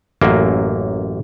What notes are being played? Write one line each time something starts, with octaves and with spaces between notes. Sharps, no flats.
A1 F#2 A#3